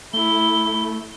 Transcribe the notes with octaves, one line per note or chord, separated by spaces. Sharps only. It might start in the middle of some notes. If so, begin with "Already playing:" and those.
A3 E4 G7